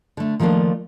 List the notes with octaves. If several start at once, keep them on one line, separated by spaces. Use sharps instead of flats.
D3 A3
D#3 F3 G3 A3 A#3 D4